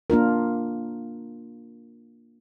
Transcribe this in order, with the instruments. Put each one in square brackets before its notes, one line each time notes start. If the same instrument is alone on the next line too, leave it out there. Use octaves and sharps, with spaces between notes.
[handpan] A#3 D4 F4 A#4